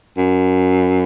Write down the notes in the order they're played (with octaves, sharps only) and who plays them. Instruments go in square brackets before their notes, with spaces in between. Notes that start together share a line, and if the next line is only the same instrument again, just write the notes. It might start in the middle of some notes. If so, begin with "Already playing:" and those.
[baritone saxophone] F#2